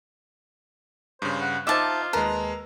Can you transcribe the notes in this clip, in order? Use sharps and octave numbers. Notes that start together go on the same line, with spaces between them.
G2 C#3 C5
F#5
D#4 F4 C5 D#5 E5 A5 D6 E6
D#2 G#3 A#4 B4 A5